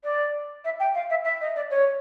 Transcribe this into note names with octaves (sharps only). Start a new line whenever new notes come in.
D5
E5
G5
F5
E5
E5
D#5
D5
C#5